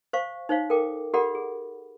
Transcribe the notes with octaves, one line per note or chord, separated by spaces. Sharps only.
C5 F5 C#6
D#4 C5 C#5 F5
A4 A#4 G5 D6
G4 A4 A#4 D5 F#5 B5
G#4